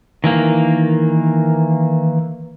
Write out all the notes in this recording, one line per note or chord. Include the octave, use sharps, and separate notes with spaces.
D#3 E3 A#3